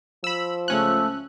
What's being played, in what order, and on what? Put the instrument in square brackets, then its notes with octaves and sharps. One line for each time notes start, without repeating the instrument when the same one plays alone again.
[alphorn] F3 [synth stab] B5 E6
[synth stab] C#2 C#4 F#6 [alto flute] A3